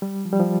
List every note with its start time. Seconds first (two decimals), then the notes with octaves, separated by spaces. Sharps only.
0.02 G3
0.25 F3
0.33 G3
0.40 F3